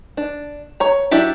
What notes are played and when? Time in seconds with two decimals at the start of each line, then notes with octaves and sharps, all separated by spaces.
0.17 D4
0.80 C#5 A#5
1.11 F#3 D4 E4 G4